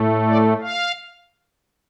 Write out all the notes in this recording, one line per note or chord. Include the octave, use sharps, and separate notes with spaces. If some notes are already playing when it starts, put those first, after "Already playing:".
Already playing: A2 A3
D5
F5